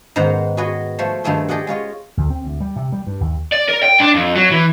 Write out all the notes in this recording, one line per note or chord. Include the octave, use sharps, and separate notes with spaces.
G#2 D#3 B3 C5 F#5 A#5
F#4 G#4 B4 C#5 D#5
F3 A3 C5 C#5
G2 D#3 F3 A3 G#4 C6
G4 G#4 D5 D#5 F#5
G#3 F4 C#5 D#5
D2
C4
D2
G3
C3
G3
G2
D#2
D5
A#4
G5
D4
F2
F#3
E3